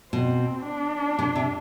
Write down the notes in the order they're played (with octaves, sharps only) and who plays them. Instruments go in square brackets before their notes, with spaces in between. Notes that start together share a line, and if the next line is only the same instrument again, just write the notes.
[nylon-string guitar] B2 [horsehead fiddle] C4
[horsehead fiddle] D4
[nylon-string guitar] C3
C3